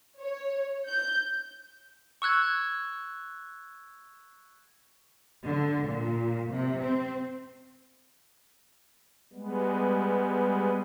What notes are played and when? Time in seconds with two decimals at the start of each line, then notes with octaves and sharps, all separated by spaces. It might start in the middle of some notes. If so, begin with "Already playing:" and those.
0.19 C#5
0.89 G6
2.22 C#6 E6 F#6 G#6
5.45 D3
5.85 A#2
6.50 C3
6.81 C4
9.33 G3 G#3 B3